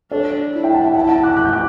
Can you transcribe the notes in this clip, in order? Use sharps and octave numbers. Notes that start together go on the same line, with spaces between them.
D4 A4 C#5
E4
E5 G5
F#5 A5
E5 G5
E4 F#5 A5
F#5 A5
D6 F#6
F#6
G6
D6 F#6